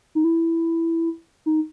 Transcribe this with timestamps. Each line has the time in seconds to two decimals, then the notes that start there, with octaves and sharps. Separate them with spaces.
0.15 D#4
0.24 E4
1.46 D#4